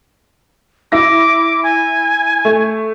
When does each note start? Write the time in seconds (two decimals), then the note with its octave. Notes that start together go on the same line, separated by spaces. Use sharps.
0.92 E4 D6 A#6
1.63 G#5
2.45 A3